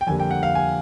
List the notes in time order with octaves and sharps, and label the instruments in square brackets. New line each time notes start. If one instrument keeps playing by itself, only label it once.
[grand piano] G5
F2 D3 G3 A#3 G#5
G5
F#5
F5
G#5